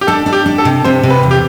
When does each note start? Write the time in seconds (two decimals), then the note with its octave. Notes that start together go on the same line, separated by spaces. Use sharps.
0.01 G4
0.07 D4 A4
0.26 D4
0.33 G4
0.46 D4
0.58 A4
0.65 C3
0.84 C3 C5
1.03 C3
1.10 B4
1.23 E2
1.31 G4